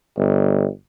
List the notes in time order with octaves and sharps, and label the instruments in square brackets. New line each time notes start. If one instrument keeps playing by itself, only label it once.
[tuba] G1